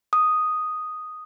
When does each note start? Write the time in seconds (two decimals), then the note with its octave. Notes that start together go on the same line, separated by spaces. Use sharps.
0.13 D#6